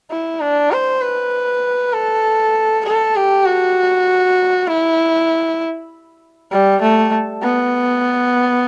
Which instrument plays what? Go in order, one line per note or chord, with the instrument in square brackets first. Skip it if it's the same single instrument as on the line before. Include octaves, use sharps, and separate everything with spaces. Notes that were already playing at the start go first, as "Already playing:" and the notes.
[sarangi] E4
D4
C5
B4
A4
A4
G4
F#4
E4
G3
A3
B3